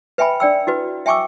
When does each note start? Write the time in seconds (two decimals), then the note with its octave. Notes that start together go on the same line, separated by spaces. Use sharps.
0.18 B4 E5 G5 G#5 B5
0.40 D4 D5 G5 E6
0.67 E4 F#4 B4
1.06 E5 G5 G#5 C#6 D6 E6